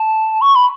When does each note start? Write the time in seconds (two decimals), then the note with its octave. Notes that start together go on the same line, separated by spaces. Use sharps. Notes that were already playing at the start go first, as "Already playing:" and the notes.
Already playing: A5
0.41 C#6
0.56 B5